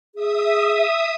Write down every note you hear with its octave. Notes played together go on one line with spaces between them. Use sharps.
G#4 E5 D#6